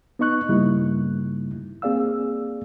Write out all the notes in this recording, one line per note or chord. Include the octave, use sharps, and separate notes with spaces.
B3 D#4 D#5 C#6 F#6
G2 C#3 G3 A#3 D#4 E4
A#3 C4 G#4 D5 F5 E6